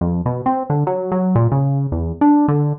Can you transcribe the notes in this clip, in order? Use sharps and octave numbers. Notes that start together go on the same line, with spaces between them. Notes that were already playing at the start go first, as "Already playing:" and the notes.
F2
B2
C4
D3
F#3
F#3
A#2
C#3
E2
D4
D3